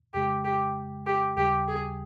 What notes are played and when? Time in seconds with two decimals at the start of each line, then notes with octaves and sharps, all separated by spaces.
0.14 F2 C#3 G#3 G4
0.44 G4
1.06 G4
1.37 D#2 C#3 G3 G4
1.68 G#4